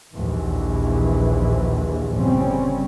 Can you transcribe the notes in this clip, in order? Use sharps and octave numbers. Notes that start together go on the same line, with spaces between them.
A#1 D#2 E3
G1 C#3 G3 C4 C#4